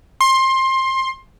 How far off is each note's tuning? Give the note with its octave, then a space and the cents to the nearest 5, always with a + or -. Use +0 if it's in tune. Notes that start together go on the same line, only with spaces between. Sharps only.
C6 +20